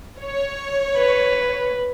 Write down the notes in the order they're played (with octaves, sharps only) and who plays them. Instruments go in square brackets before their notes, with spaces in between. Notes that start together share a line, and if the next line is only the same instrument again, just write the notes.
[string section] C#5
[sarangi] B4